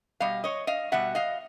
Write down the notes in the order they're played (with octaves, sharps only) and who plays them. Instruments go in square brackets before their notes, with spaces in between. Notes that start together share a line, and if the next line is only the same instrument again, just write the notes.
[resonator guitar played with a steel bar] B2 G3 D#5 F5
C#5 D#5
D#5 F5
B2 G3 E5 F#5
D#5 F5